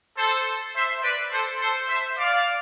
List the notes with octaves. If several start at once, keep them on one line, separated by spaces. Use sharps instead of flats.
A4 C5
C5 E5
B4 D5
A4 C5
A4 C5
C5 E5
D5 F5